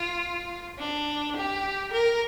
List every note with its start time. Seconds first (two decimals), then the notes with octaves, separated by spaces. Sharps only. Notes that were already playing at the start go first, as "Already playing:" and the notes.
Already playing: F4
0.79 D4
1.36 G4
1.93 A#4